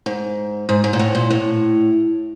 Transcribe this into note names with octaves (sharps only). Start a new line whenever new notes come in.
G#2
G#2
G#2
A#2
A2
A#2
A2